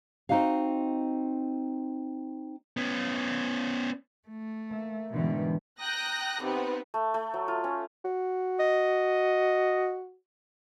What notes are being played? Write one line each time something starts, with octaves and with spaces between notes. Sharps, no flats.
C4 C#4 D#4 F#4 D#5 F5
B3 C#4
A3
A#3 E5
G#2 B2 D3 E3 G3
G5 A#5 D#6 F#6 A#6
C3 B3 C4 D#4 B4
A3
A3
F#3
F4
C#4
F#4
D#5